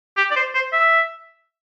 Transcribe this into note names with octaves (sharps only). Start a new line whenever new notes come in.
G4
D5
C5
C5
E5